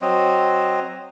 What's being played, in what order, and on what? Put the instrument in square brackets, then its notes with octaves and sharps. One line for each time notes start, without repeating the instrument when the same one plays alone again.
[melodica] F#3 C4 D#5